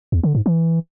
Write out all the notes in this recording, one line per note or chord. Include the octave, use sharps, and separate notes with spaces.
E2
D3
G#2
E3